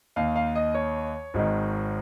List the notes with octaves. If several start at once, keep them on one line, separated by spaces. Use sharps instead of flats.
D#2 D#3 F5
F5
D#5
C#5
G#1 G#2 D#3